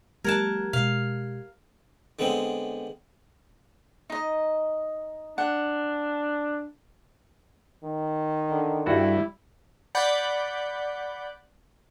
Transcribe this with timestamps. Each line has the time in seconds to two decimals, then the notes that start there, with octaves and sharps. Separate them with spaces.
0.24 F#3 G#3 A#3 G4 A#4 F#5 A5 G#6
0.73 B2 G#3 F5
2.19 D3 G#3 B3 C4
4.10 D#4 D#5
5.38 D4 F#5
7.84 D#3
8.50 D3
8.86 G2 G3 E4 F#4 A4
9.95 D5 F#5 B5 G6